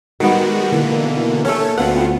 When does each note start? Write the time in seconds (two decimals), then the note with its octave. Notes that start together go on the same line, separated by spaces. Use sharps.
0.20 D#3 G3 G#3 B3 F#4
0.72 B2 D3 E3 A#3
1.45 A3 C#4 A4 C#5
1.77 D2 B3 C4 F4 F#5